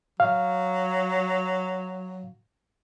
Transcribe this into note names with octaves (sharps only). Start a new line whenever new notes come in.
F#3 F5